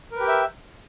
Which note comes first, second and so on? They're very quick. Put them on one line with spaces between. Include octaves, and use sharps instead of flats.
A#4 B4 G4 G5 E5